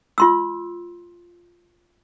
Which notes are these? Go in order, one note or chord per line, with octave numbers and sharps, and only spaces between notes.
F4 C6 E6